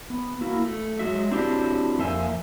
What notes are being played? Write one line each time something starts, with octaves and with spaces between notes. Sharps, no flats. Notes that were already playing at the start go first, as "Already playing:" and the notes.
B3
A#3 E4 F#4
A3
F#3 G#3 F#4 E5
C4 D4 E4 F#4 G4 C5
F2 A#3 C5 E5 G#5